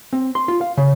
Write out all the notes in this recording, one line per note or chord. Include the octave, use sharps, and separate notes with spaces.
C4
C6
F4
F5
C#3